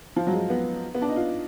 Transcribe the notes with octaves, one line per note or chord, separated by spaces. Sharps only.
F3
F#3
G#3
B3
B3
D4
D#4
F4